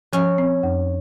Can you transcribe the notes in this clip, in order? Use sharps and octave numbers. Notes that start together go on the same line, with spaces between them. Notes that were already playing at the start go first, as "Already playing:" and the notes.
F3 C#4
C4
F2